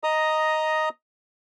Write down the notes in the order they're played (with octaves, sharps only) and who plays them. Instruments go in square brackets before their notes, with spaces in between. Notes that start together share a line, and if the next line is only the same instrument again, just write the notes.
[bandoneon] D#5 A#5 D#6